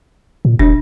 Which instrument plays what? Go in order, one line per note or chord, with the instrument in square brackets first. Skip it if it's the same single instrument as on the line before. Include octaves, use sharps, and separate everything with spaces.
[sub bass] A#2
[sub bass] E1 [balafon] D4